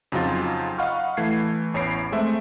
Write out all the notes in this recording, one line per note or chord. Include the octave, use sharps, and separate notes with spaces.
F2 C#3 F#3 D#4 F4 A6
D#5 F5 F#5 B5 C#6 F6
E3 A3 G#6 C7
A1 E2 C#5 B5 C7 D7
G#3 A3 C4 E5